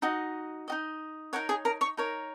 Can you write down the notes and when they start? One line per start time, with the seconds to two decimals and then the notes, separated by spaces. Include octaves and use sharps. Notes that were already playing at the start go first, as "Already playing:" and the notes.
0.02 D#4 F#4 D#5
0.68 D#4 F#4 D#5
1.33 D#4 A#4 C#5 F#5
1.49 G#4 G#5
1.65 A#4 A#5
1.81 C#5 C#6
1.97 D#4 A#4 C#5